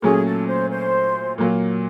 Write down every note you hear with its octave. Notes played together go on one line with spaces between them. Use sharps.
A#2 F#3 A3 C#4 G#4
A4
C5
C5
A#2 F#3 A#3